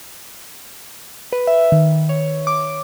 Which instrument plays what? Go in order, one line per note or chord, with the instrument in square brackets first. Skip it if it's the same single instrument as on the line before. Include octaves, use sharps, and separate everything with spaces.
[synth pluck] B4
E5
D#3
C#5
D6